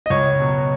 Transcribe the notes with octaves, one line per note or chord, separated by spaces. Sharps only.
D#5
C#2 C#5
B2 F#3